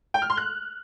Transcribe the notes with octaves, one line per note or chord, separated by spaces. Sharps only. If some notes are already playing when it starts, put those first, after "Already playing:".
G5
F6
C6
F#6